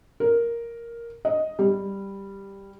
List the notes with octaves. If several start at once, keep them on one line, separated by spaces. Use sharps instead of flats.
A#4
D#5
G3